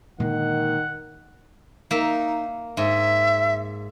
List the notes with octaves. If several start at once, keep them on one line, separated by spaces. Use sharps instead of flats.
A#2 D3 D#3 G#3 F#5
A#3 D#4 E5
G#2 E5